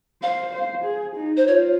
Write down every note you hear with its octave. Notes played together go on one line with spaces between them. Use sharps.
C5 F5
C5
G#4
D#4
C5
F4 C#5